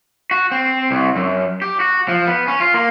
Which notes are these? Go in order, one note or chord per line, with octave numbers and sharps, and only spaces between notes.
F#4
C4
C2
F#2
G4
F#4
F3
B3
C#4
F4
A#3